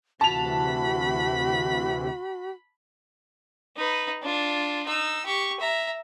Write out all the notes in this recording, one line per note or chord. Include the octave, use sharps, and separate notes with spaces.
D2 C3 E3 F#4 A5 B5 F7
D#4 B4
D4 F4
D#4 E6
G4 C#6
E5 A#5